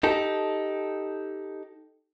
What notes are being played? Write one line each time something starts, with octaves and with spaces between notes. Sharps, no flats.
D#4 G4 A4